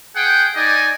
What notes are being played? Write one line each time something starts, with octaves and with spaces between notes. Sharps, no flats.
G#4 F#5 G5
D#4 D5 D#5 G#5